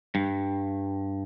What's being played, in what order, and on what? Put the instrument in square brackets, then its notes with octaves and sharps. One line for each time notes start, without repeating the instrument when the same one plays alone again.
[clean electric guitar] G2